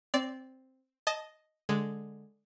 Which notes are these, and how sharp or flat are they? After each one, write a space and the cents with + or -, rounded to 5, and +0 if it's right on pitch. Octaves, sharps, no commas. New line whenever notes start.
C4 +0 D5 -20
D#5 +0 A5 -15
D3 +0 G#3 +0